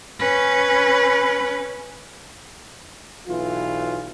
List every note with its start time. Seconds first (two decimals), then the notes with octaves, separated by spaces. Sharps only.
0.19 C#4 B4
3.28 B1 E3 F4